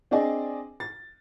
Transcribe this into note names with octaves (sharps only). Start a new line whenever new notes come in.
C4 D4 G#4 D5 D#5 G#5
A6